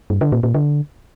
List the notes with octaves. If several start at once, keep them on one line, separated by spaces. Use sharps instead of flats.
G2
D3
A#2
A#2
D3